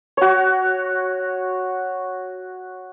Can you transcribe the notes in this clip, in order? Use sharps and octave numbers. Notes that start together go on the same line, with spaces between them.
F#4 C#5